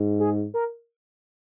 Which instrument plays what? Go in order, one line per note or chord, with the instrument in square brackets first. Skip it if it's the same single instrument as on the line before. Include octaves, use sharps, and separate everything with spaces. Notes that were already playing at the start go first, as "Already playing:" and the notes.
Already playing: [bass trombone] G#2
[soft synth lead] G#4
A#4